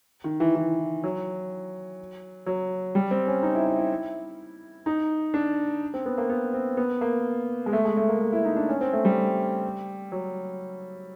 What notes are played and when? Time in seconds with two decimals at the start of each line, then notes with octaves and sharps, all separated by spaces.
0.24 D#3
0.40 E3
0.55 E3
1.04 F#3
2.46 F#3
2.95 G3
3.11 C4
3.27 C#4
3.43 D#4
3.55 E4
3.67 E4
3.79 E4
4.86 D#4
5.34 D4
5.94 C4
6.06 B3
6.18 A#3
6.30 B3
6.54 C4
6.77 B3
7.01 A#3
7.66 G#3
7.73 A3
7.85 G#3
7.97 A3
8.09 A#3
8.21 A#3
8.33 E4
8.45 D#4
8.56 D4
8.69 C#4
8.81 C4
8.93 A3
9.05 G3
10.12 F#3